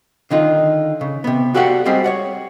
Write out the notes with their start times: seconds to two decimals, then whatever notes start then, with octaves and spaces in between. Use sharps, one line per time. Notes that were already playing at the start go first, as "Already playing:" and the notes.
0.31 D3 D#3 D#4 F4
1.01 C#3
1.24 C3 B3
1.54 F#4 G4 A4 D5 F5 F#5
1.86 G3 G#3 C4 G4 G#4
2.04 C#5 D5 F#5